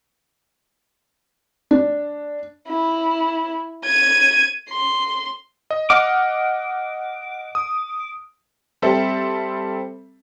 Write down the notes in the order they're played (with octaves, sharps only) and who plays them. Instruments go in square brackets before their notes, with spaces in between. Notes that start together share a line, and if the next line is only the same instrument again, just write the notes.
[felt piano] D4
[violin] E4
G#6 D#7
C6
[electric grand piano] D#5
[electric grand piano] D#5 F#5 F6 [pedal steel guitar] D6
[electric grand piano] D#6
[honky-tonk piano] G3 C4 A4 E5 A5